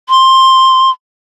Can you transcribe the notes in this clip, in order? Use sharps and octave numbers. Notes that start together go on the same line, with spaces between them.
C6